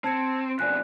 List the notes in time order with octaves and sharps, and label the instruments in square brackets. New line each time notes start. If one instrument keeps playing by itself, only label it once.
[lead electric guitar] C4 [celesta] A5 G#6 C#7
[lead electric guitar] F2 B2 [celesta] D5 G#5 F#6